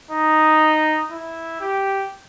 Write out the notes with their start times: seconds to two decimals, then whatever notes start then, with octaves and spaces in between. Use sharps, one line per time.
0.11 D#4
1.11 E4
1.61 G4